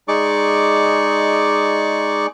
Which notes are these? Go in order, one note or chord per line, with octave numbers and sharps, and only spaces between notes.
G#3 D#4 G#4 D5 C#6 D6